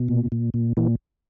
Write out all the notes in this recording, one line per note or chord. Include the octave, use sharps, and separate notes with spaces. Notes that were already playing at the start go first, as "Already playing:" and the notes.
Already playing: B2
A#2
A#2
A#2
A#2 E3